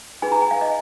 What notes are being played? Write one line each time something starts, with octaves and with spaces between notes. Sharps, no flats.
D#4 G#4 B4 G#5
A#5
G#5
F5
D#5